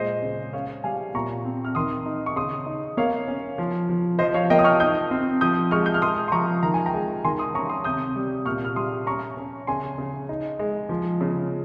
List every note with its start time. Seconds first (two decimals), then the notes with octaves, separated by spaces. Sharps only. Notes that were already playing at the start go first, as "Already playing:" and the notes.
Already playing: A#2 G#3 C5 D#5
0.22 C#3
0.53 C#4 C#5 F5
0.84 G3 F5 G#5
1.14 A#2 A#5 C#6
1.45 C4
1.65 F6
1.75 D#3 C6 D#6
2.06 D#4
2.26 C#6
2.36 C#3 C6 D#6
2.66 D#4
2.97 A#3 C#5 F5
3.28 C#4
3.58 F3
3.89 F3
4.19 F3 C5 D#5
4.34 C#5 F5
4.50 A#3 D#5 G5
4.59 D#6
4.64 C#6 F6
4.80 D#4 D#6 G6
5.11 C4
5.41 F3 D#6 G6
5.71 G#3 C#6 F6
5.86 G6
5.94 F6
6.02 G#3 C6 D#6
6.28 C6
6.32 F3 A#5 C#6
6.63 D#3 A#5
6.74 G#5
6.86 G5 A#5
6.94 G#3
7.24 D#3 G#5 C6
7.39 C6 D#6
7.54 C#4 A#5 C#6
7.69 C6 D#6
7.84 C3 D#6 G6
8.16 G3
8.45 A#2 C#6 F6
8.65 F6
8.76 G3 C6 D#6
9.06 C#4 A#5 C#6
9.37 C#4
9.67 C#3 G#5 C6
9.98 C#3
10.29 D#4
10.59 G#3
10.89 F3
11.21 C#3